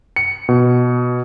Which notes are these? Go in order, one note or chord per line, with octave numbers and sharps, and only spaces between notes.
C#7
B2